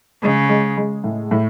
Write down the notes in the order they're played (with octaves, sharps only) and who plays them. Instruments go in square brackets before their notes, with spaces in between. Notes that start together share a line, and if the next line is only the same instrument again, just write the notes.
[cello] C#3 [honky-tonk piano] G#3
[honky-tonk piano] G#3
G#3
A2
A2